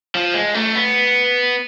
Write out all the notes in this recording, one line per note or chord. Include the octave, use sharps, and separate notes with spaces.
F3
G#3
A3
B3